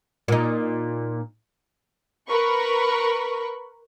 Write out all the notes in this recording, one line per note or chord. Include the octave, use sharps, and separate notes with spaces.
A#2 D#4
A#4 B4 B5 C#6